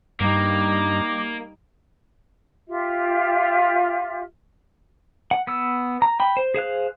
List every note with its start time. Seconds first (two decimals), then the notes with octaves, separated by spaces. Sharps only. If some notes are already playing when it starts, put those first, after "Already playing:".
0.20 G2 G3 A#3 D#4 G4 A#5
2.68 F4 G4 E5
5.31 F#5
5.47 B3 E6
6.02 A#5
6.20 G5 B5
6.37 C5
6.54 G#4 C5 F5 F#6